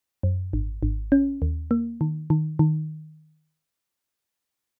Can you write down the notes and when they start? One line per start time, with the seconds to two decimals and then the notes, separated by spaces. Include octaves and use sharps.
0.23 F#2
0.53 G#1
0.83 G#1
1.12 C#4
1.42 D#2
1.71 A#3
2.01 D#3
2.30 D#3
2.59 D#3